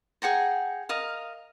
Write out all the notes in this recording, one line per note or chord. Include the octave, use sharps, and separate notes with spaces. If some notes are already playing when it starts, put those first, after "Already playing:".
G#4 F#5 G5 A#5
A#4 D#5 F5